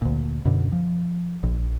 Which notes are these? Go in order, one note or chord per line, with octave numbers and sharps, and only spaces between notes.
D2 A#2
F#2 B2 D3
F3
A#1